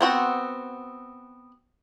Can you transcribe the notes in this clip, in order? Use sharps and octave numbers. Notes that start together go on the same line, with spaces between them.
B3 C4 F#4